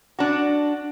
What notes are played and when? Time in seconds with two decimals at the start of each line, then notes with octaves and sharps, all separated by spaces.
0.19 D4 F#4